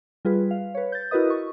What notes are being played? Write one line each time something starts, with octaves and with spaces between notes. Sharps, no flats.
G3 F4 G#4 B4
F5
B4 C#5
G6 A6
E4 F#4 A#4 B4 D#5 D#6
C#6